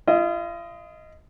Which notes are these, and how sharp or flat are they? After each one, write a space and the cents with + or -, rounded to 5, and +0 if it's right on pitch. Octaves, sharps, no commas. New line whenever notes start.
F4 -40 D#5 +10